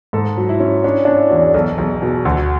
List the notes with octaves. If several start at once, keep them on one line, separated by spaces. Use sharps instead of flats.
G#2 A4
F#3
E4
C#4
C#4 D4
C#4 D4
E4
E2 F#4
G#4
B1 A4
B1 G#4
B2 G#4
D2 F#4